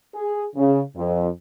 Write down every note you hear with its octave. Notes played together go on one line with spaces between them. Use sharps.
G#4
C#3
F2